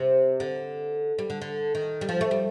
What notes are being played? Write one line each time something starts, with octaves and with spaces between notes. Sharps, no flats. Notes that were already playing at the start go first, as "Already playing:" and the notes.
Already playing: C3
D3
G3
D3
D3
D#3
G3
F3
A3
G3